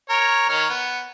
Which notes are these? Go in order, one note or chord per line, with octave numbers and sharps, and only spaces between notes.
A#4 C#5
D#3 C#5 F6
B3